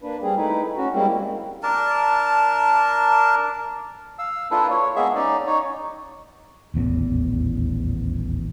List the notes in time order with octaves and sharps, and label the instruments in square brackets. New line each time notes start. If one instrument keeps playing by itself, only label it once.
[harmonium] A#3 D4 B4
G3 C4 G#4
A3 D#4 E4 B4
C#4 F#4
G3 G#3 A#3 C4 E4
[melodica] D4 A#4 A5
[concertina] F5 E6
A#3 D4 E4 F4 A4 B4
C#5
G#3 A#3 B3 G#4 E5
C#4 D#4 D5
D#4 C#5
[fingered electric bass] D#1 A1 E2